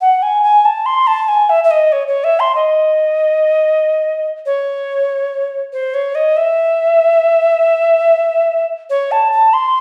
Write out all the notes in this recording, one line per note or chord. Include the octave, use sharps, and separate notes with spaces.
F#5
G#5
G#5
A5
C6
A5
G#5
E5
E5
D#5
C#5
C#5
E5
C6
D#5
C#5
C5
C#5
D#5
E5
C#5
A5
A5
C6